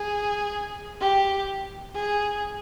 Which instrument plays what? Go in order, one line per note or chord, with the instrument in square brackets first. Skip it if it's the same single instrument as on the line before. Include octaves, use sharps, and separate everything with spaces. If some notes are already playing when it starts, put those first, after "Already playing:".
Already playing: [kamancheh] G#4
G4
G#4